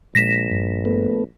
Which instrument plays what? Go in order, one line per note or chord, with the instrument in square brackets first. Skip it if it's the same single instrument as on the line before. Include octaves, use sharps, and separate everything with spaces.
[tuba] A#1 [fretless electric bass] A#2 G#3 [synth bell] A#6 B6 E7
[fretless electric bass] G1 G2
[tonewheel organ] A3 B3